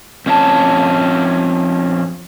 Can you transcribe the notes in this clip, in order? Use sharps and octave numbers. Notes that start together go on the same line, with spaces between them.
F2 C#4 F#4 A5